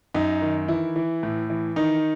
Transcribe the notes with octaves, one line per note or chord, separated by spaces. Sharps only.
F#2 D#4
D#3
E3 E4
E3
A2
E3
D#3 D#4